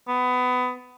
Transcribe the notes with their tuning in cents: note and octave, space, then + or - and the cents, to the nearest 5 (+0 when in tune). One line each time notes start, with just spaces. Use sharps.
B3 +20